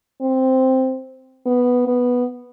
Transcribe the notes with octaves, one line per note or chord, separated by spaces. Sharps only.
C4
B3
B3